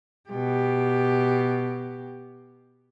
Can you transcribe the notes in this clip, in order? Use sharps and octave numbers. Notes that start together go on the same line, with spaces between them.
B2 G4